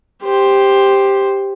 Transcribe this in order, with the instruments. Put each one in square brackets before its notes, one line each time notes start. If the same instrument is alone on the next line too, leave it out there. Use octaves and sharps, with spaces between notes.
[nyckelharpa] G4 C5